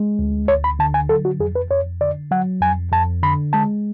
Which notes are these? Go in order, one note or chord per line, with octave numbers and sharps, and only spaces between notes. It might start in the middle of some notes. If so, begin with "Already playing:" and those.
Already playing: G#3
D2
D2 C#5
B5
D3 A5
G#5
F#3 A4
F#4
F2 G#4
B4
F2 C#5
D3 D5
F#3 F#5
F2 G#5
F2 A5
D3 B5
G#3 A5